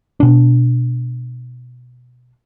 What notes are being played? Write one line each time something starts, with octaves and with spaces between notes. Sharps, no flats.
B2 D4